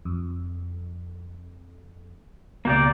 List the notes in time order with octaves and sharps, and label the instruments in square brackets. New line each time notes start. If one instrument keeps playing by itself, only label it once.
[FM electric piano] F2
[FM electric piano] C#2 B2 [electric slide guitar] A#3 G4 D5